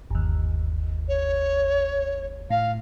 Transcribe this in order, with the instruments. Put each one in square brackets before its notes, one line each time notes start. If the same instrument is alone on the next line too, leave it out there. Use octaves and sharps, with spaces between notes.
[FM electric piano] G1 D#2
[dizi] C#5
[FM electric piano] A2 [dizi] F5